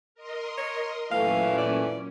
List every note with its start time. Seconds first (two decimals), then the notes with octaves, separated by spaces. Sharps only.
0.15 A#4 D#5 C6
0.57 C#5
1.11 F#2 A#2 E3 A3 C#4 F5
1.58 D5